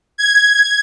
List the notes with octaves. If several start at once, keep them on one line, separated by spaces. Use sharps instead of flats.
G#6